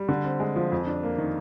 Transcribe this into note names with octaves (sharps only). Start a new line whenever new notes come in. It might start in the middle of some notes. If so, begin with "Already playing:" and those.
Already playing: G3
D3
C4
G#3
F3
F2
D4
A#3
D#3